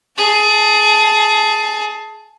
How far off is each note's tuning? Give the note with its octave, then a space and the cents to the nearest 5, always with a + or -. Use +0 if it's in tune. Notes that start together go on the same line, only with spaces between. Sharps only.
G#4 +20 A5 +0